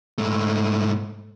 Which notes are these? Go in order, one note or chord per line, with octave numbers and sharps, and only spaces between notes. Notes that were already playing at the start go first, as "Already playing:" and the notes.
G#2 A3